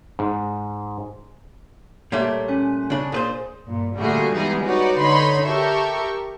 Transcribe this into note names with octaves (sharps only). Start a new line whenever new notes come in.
G#2
A#2 G3 A3 C#5
C#4 G#5 F#6
C#3 D4
A#2 G#4 B4 C5
G2 A#2
A#2 D3 G3 A3 F#4 G#4
E3 G3 G#3 B3 D#4 G#4
D#4 F#4 B4 C#5 D5 F#5
D3 D#4 C#5 B5 C6
G4 A4 A#4 E5 C#6